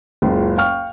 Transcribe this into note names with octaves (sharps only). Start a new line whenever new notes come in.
F#1 C#2 F4
F5 G5 C#6 F6